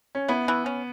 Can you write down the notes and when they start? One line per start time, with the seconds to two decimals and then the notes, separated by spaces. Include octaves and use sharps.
0.15 C#4
0.28 B3 E4
0.48 E3
0.66 C#4